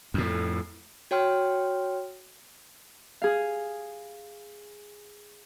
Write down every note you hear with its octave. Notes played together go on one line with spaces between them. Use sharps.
F2 A2
F#4 C#5 G5 C6 F6
G#4 F5